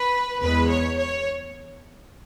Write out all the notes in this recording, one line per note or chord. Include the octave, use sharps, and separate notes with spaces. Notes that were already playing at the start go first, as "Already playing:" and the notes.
Already playing: B4
E2 E3 G#3 B4
C#5
C#5